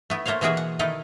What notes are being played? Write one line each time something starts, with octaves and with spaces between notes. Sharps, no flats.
A3 B3 E4
A3 A#3 C5 C#5 F5
B2 E3 A#3 F#4 G#4 E5
F#5
D#3 D#4 E4 A4 A5